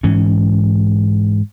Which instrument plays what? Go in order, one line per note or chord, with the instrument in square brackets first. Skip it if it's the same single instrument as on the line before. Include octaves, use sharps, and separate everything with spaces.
[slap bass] G#2 E3 C#4